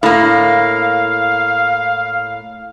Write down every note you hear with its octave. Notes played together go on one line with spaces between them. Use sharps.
A2 A#3 F5